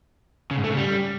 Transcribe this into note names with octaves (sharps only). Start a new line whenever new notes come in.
C#3
G#2
A3
C#3
G3